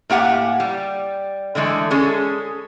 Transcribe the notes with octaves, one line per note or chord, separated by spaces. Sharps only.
A2 A#3 G4 F#5 G#5
G3
D3 E3 G#3 A3
G#3 C#4 G#4 A4